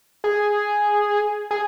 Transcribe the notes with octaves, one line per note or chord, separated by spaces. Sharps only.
G#4
G#4